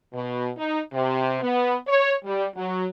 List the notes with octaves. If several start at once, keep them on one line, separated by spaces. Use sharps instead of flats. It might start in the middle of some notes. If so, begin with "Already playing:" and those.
B2
D#4
C3
B3
C#5
G3
F#3